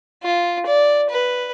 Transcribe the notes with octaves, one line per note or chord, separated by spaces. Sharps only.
F4
D5
B4